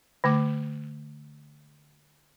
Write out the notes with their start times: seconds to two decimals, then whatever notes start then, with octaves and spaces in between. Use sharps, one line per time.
0.24 D3 A3 D6